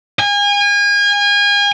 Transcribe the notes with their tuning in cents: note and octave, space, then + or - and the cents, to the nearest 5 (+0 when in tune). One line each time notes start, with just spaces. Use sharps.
G#5 -35